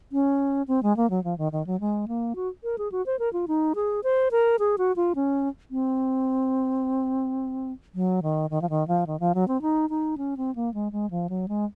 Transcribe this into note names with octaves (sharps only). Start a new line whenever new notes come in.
C#4
C4
G#3
A#3
F#3
F3
D#3
D#3
F#3
G#3
A#3
F#4
A#4
G#4
F#4
C5
A#4
F4
D#4
G#4
C5
A#4
G#4
F#4
F4
C#4
C4
F#3
D#3
D#3
F3
D#3
F3
D#3
F3
F#3
C4
D#4
D#4
C#4
C4
A#3
G#3
G#3
F3
F#3
G#3